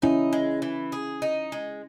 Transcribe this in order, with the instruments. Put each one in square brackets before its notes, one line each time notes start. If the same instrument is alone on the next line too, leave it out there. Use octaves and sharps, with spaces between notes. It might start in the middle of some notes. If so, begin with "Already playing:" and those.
[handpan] C#4 E4 [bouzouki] D#4
[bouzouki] G#3
E3
G#4
D#4
G#3